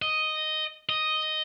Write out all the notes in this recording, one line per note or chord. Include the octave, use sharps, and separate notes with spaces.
D#5
D#5